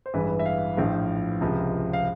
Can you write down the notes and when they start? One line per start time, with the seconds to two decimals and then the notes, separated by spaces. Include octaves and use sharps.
0.06 C5
0.14 A1 G2 E3 G#3 B4
0.39 E5
0.45 F5
0.77 A#1 A2 F3
1.41 C#2 C3 F3 G#3
1.93 F5